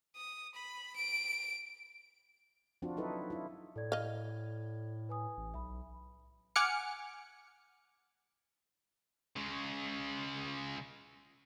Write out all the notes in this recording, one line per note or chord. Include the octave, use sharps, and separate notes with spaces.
D#6
B5
D7
F3 C4 D4 F4 F#4
F#3 D#4 E4 A4 B4
E4 F4
A2 A4 D5 G#6
D#5 F5
B4 G#5 D#6
A1
B1 E5 B5
F#5 G#5 D6 F6 C#7
C#3 G#3